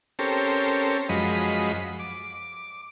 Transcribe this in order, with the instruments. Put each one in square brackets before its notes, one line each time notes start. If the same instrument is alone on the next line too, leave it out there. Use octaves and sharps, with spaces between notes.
[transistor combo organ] C4 C#4 G4 A4 A#4
F#2 F3 G#3 D#5 B5
D6